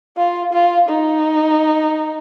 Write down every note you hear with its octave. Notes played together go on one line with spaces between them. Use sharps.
F4
F4
D#4